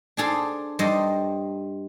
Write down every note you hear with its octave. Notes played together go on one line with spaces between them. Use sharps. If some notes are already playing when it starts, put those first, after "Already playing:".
D4 G#4 A4 C5
G2 A4 C5 D#5